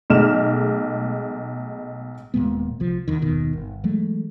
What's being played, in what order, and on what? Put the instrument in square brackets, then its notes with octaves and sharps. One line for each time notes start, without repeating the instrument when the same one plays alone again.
[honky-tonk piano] B1 G#3 A3 D#4 F6 E7
[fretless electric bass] D#1 A#2 G#3 B3
C2 F3
E2 D#3
F#1 D#2 B2 D#3
G1
E3 F#3 G#3 A3